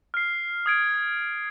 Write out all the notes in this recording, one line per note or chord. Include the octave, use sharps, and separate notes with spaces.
F6 C7
D#6 G#6 D7